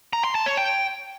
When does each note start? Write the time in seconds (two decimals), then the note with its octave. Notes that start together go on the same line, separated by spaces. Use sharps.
0.13 A#5
0.24 C6
0.35 A5
0.46 C#5
0.57 G5